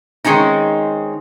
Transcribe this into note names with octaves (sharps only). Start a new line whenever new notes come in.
D#3 G#3 C4 C#4 D#4